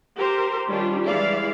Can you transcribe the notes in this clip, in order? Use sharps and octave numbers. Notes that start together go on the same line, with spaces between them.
G4 A#4 C5
D#3 G3 C#4 D4 F4 G4
E3 G3 G#3 E4 D5 F5